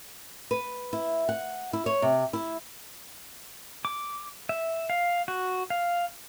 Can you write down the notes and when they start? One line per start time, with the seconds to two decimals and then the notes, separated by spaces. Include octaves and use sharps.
0.51 B4
0.93 E4
1.29 F#5
1.73 E4
1.86 C#5
2.02 C3
2.33 E4
3.85 D6
4.49 E5
4.90 F5
5.28 F#4
5.70 F5